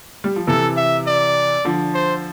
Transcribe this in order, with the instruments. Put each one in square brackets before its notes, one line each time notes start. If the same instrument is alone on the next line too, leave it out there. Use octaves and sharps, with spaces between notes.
[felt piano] G3
F3
[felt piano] C3 E3 [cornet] A4
[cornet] E5
D5
[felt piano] D3 F3
[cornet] C5